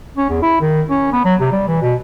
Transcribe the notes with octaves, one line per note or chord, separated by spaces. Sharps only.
C#4
E2
E4
D#3
C#4
B3
F#3
C3
G3
E3
B2